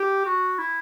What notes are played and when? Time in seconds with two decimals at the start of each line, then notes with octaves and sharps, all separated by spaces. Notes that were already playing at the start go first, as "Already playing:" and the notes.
Already playing: G4
0.26 F#4
0.59 E4